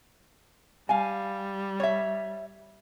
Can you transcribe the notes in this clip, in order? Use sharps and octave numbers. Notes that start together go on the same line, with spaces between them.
G3 F5 G#5
C#5 E5